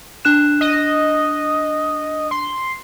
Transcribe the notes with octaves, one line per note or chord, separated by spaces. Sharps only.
D4 F#6 E7
D#5
C6